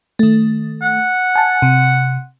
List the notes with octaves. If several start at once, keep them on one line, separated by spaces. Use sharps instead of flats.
D#3 A3
F#5
G#5 A5
C3